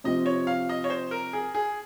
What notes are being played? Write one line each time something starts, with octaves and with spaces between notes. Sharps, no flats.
C3 F3 C4 D#5
C#5
F5
D#5
C#5
C5
A#4
G#4
G#4